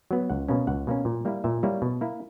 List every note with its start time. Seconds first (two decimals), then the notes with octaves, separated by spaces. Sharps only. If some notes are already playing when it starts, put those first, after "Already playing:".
0.11 F#3 B3
0.30 C#2 F#5
0.48 B2 A#3 C#4
0.67 C#2 F#5
0.87 B2 A#3 C#4
1.05 A#2
1.25 G3 A#3 E4
1.44 A#2 E5
1.63 G3 A#3 E4 C#5
1.82 B2
2.01 A#3 E4